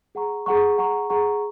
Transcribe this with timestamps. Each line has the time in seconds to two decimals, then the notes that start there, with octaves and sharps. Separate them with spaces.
0.15 G#4 F#5 A#5 C#6
0.46 G#4 F#5 A#5 C#6
0.78 G#4 F#5 A#5 C#6
1.10 G#4 F#5 A#5 C#6